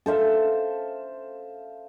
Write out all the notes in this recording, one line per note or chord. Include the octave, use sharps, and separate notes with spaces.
A4 C5 E5 F5